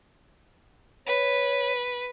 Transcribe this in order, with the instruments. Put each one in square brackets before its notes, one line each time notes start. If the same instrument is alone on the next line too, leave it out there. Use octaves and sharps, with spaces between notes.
[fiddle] B4 [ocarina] C#5